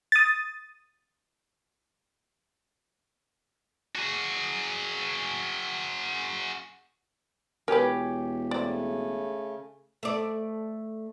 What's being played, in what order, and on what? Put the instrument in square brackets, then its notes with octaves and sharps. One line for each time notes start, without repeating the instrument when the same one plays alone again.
[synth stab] D#6 A6
[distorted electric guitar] F#4 G#4
[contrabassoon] E1 [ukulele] G4 C#5 G#5 [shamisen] A#4 B4
[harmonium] C#3 A3 [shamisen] C4 D5
[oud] A3 D5